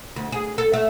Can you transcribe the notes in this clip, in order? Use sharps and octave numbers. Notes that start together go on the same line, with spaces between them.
D2
G#4
A4
A3